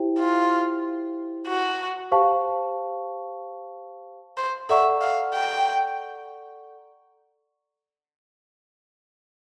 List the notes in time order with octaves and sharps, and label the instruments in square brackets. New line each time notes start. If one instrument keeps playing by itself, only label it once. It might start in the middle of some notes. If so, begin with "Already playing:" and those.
Already playing: [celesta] E4 G4 C5 E5 G5
[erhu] F4
F#4
[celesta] G4 C5 F5 A5 C#6
[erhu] C5
[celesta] A4 D5 F#5 A#5 C#6 [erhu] E5
[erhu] F5
G5